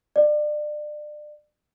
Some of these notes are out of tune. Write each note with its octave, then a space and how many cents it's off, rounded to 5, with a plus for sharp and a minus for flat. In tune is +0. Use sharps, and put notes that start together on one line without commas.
D5 +30